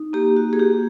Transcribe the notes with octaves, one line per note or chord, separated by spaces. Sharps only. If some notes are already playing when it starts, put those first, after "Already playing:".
Already playing: D#4
A#3 G4
F#4
G#4
F#4 G4